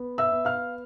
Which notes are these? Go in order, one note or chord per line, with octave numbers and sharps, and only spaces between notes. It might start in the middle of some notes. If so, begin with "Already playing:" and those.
Already playing: B3
E5 E6
B3
F5 F6